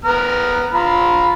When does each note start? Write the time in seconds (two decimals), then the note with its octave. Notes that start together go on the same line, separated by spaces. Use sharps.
0.05 B3 A#5 F6
0.73 F4 A#5 B5